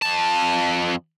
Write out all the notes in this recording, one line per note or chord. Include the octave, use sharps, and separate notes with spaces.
F2 A5